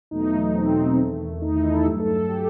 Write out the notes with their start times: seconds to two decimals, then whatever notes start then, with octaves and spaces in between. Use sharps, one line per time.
0.11 E2 B2 F#3 A3 D#4
0.55 C4
0.98 E2 D#3 A3
1.42 D#4
1.56 E4
1.70 A4
1.85 G2 F#3 A3 G4
2.00 A4
2.15 A4
2.29 G4